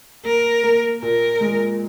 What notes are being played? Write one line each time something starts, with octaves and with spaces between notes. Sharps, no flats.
A#3 A#4
A#3
A#2 A#4
G#3